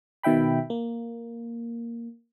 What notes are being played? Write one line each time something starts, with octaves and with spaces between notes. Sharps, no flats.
B2 D#3 E5 G5 B5
A#3